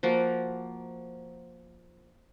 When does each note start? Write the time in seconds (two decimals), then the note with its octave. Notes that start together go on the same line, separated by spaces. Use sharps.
0.03 F3 A#3 F#4